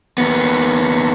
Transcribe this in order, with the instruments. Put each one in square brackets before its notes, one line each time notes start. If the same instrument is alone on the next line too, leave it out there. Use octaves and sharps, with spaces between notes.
[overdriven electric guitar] D#2 B3